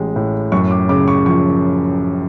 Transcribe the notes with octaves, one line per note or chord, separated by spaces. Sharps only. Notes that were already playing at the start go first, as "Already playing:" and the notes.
Already playing: A1 G#3
A2
F#2 C#6
D6
C#3 D6
C#6
F3 C#6